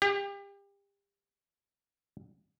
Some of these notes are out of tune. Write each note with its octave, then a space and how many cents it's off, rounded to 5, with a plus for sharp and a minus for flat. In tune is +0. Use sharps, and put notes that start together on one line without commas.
G4 +30